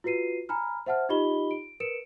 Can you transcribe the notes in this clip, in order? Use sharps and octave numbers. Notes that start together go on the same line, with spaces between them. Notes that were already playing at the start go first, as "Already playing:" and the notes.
F4 F#4 B4 C7 D#7
G#5 A#5 B5 F6
C5 E5 F#5 A5 F6
D#4 F4 G4 D#5 B5 G7
D7
A#4 B4 C#7 D7 E7